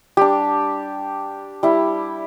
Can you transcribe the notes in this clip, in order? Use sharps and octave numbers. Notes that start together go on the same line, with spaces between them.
G3 D4 G4
G3 E4